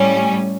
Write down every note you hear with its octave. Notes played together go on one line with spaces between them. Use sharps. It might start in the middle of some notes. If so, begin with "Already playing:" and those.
Already playing: A2 G3 C#4